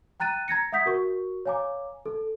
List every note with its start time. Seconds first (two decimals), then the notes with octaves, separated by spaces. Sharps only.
0.20 G5 A#5 F#6 A6 D#7
0.48 A#5 G#6 A#6 C#7
0.72 E5 F#5 D#6 G6 B6
0.86 F#4 A#4 C#6
1.46 C#5 F5 G#5 A#5 D6
2.06 A4